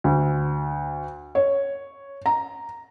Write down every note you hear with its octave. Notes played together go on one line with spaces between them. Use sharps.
D2
C#5
A#5